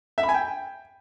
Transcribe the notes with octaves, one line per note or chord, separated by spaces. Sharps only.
E5
B5
G#5
G5